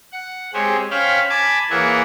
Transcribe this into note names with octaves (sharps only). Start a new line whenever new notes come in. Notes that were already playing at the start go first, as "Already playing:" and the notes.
F#5
G#3 C4 G4 G#4 C5 C#5
C#4 C5 C#5 F5 G5 B5
G#5 A5 B5 D6 G#6
E3 A#3 G#4 C#5 E5 F#5